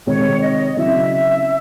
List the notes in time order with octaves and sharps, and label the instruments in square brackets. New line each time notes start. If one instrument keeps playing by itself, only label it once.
[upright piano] C3 D#3 G#3 C4 [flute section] C#5
[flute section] D#5
[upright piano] C#3 F#3 C4 E4 [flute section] E5